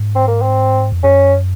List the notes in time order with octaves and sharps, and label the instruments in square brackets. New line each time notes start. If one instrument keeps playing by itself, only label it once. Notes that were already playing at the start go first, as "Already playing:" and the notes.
Already playing: [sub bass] G#2
[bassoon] C4
A#3
C4
[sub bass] F2
[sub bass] F#2 [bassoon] C#4